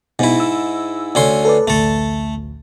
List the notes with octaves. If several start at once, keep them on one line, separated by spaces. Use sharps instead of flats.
G#2 B2 E4
E6
D2 C#4 C6
A4 B4 D5
A1 D2 A3 A4